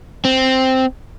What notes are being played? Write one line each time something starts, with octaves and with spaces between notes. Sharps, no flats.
C4